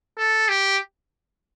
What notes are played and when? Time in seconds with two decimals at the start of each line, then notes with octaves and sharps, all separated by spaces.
0.18 A4
0.49 G4